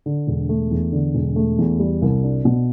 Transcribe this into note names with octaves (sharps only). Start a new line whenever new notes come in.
D3
E1
A3
E2
D3
E1
A3
E2
G3
C2
D4
B2